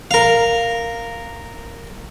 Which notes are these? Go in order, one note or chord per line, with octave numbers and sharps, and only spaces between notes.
A#4 F5